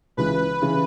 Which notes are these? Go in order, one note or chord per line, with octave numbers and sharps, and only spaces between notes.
C#2 C#3 E3 B4
C#3 E3